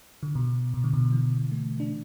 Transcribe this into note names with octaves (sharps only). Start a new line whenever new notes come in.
D3
B2
B2
D3
B2
E3
A3
D4